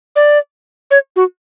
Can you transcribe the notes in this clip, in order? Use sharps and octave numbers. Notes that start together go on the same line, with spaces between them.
D5
C#5
F#4